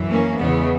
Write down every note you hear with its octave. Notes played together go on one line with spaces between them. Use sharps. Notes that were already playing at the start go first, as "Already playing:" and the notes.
Already playing: F#2 E3
A#3 C#4
E2 C#3 E3 G#3 B3